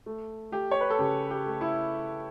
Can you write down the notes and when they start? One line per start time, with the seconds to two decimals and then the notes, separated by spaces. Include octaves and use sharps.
0.06 A3
0.52 A3 G4
0.71 C#5
0.81 B4
0.90 A4
0.99 C#3 G4
1.30 G4
1.46 A3
1.61 E4